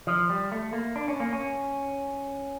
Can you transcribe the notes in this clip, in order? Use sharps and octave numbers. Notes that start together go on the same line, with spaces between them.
F3
G3
A3
A#3
D4
C#4
A#3
C#4